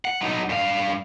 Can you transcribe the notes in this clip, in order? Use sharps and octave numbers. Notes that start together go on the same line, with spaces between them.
F#5
F#3 D#4
G2 F5